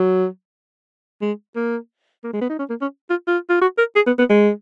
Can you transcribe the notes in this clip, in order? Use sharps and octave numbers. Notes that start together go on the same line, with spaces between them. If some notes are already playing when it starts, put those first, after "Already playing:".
Already playing: F#3
G#3
A#3
A#3
G#3
B3
D#4
C#4
A#3
C#4
F4
F4
F4
F#4
A#4
G#4
B3
B3
G#3